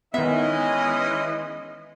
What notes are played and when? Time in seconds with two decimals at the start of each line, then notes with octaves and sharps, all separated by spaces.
0.14 D#3 E3 G#3 B3 C#4 E4 D#5 E5